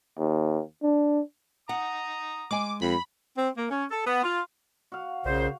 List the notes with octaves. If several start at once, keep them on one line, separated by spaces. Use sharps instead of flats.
D#2
D4
F#5 A#5 D#6
G#3 G#5 D6
F2 B5
C4
A#3
C#4
A4
B3
F4
F#4 F5
B1 A#2 C#3 C5